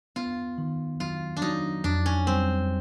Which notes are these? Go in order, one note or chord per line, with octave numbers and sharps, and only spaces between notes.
B3 F4
D#3
F#3 F4
D4
F#3 D#4
F2 D4
C#4
G3 C4